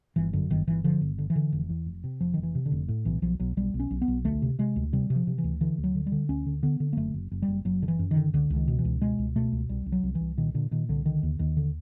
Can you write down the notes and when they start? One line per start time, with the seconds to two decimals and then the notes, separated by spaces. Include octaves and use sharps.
0.16 G1 E3
0.33 F#2 D3
0.50 G1 D#3
0.67 G1 E3
0.84 D3 F3
1.01 G1
1.18 D3
1.30 E3
1.36 D3
1.53 F1
1.69 E2
1.86 F1
2.04 C3
2.20 F1 F3
2.34 F1 D#3
2.43 E3
2.55 C3
2.66 D3
2.72 F1
2.88 A2
3.05 B1 E3
3.22 B1 F3
3.40 B1 F#3
3.57 B1 G3
3.74 B1
3.80 C#4
3.91 B1
4.02 B3
4.08 B1
4.25 D2 A3
4.42 C3
4.59 C3 G#3
4.76 D2
4.93 C3 G3
5.10 C3
5.16 F3
5.27 C3
5.38 E3
5.44 D2
5.61 D3 E3
5.78 D2
5.84 F#3
5.95 D3
6.06 G3
6.12 D3
6.29 D2 C#4
6.46 D3
6.63 D3 B3
6.80 D3
6.93 A#3
6.97 F#1 A3
7.14 F#1
7.31 F#1
7.42 G3
7.48 F#1
7.65 F#1 F#3
7.82 D3
7.88 E3
7.99 F#2
8.11 D#3
8.17 D3
8.33 C#2 D3
8.50 C#2
8.56 D#3
8.68 B2
8.78 E3
8.85 C#2
9.01 B2 G#3
9.19 C#2
9.36 B2 A3
9.52 C#2
9.69 C2 G3
9.86 C2
9.92 F#3
10.03 C2
10.15 E3
10.20 C2
10.37 A#2 D#3
10.54 A#2 D3
10.71 A#2 D#3
10.89 C2 D3
11.06 D3 D#3
11.23 D#2
11.39 D#2 D#3
11.57 D3